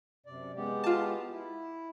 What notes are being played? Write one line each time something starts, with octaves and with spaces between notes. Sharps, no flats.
F#2 C3 D5
G#3 B3 G4
F4 A5
E4